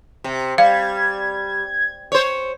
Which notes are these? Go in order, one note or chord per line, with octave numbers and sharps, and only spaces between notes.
C3
G3 F5 G#6
C5 C#5